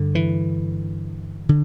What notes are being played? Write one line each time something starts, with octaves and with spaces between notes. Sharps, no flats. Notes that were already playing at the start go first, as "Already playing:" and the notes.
Already playing: G2 D3
E3
D3